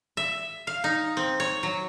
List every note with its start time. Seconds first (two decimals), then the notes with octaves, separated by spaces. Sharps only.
0.17 E5
0.67 F5
0.84 D#4
1.17 C4
1.40 C#5
1.63 F#3